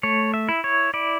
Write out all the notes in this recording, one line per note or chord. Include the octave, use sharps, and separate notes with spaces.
A3 C#5
E5
E4
C#5
E4 D5